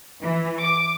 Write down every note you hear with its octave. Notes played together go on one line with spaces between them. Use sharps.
E3
D6